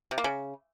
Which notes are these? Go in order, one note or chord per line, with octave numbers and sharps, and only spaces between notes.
C3
A#3
C#3